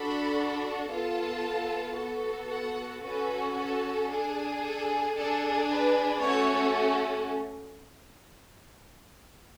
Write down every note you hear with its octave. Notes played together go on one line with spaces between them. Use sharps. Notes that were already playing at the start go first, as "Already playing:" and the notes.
Already playing: D4 F#4 A4 B5
B3 F4 A4 A5
B3 F#4 A4
F#5
C#4 F#4 A4 B4
A4
D4 G#4
A4
D4 G#4 A4
B4
A3 C#4 F#4 A4 C#5